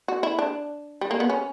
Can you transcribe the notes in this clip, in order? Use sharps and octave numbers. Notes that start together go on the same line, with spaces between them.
F#4
E4
D4
G3
A#3
B3
C#4